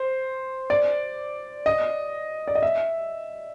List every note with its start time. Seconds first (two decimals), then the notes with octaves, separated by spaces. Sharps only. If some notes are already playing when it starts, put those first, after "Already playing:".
Already playing: C5
0.70 D5
1.66 D#5
2.48 D5
2.55 D#5
2.63 E5